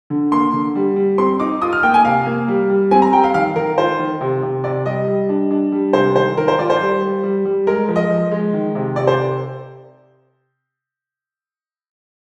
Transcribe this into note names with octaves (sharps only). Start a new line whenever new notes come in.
D3
A#3 C6
D3
G3
G3
C4 C6
D#4 D6
F4 D#6
F6
A#3 G5
G#5
C3 F5
A#3
G3
G3
C4 G#5
A#5
G3 G5
F5
D#3 F5
D#3 A#4
F4 C5
D#3
C3
C3
C3 D5
G3 D#5
G3
D4
D4
G3
C3 C5
D#3 C5
D#3 A#4
C5
F4 D5
C5
G3
G3
G3
G3
G#3 A#4
F3
D#5
F3
G#3
D#3
C3
C3 D5
C5